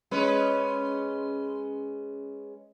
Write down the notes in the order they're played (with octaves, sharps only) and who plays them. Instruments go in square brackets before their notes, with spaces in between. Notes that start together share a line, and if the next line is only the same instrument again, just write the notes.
[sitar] G#3 C#4 B4